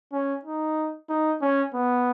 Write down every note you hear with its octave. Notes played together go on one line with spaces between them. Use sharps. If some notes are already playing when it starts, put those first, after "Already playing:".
C#4
D#4
D#4
C#4
B3